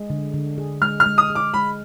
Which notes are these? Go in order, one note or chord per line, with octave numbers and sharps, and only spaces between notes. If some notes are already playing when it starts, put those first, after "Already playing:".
Already playing: G#3
D3
D3
G#4
G#3 F6
F6
G#3
D#6
G#4
D6
G#3 B5